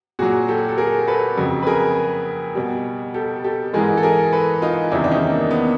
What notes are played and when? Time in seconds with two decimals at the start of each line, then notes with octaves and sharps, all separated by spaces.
0.19 A#2 F#3 F#4 G#4
0.48 G4 A4
0.69 A4
0.78 G#4 A#4
1.07 A4 B4
1.37 F2 C#3 F#3
1.62 B4
1.67 G#4 A#4
2.55 B2 G3
3.14 G4 A4
3.44 G4 A4
3.74 G#2 E3 G#3 G#4 A#4
3.97 A4
4.03 G#4 A#4
4.33 A4 B4
4.62 D#4 F4
4.92 E2 C3 D#3 G3 D4 E4
5.04 D4
5.11 C#4 D#4
5.30 A#3
5.51 B3